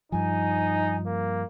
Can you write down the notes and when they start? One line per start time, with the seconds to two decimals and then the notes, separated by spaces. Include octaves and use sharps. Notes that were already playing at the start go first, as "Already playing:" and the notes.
0.12 G2 F3 D#4 G#5
1.06 A#3